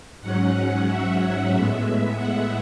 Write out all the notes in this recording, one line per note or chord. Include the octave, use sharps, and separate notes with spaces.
G#2 F#3 C#4 F#5
E5
A2 G#3 B3
F#5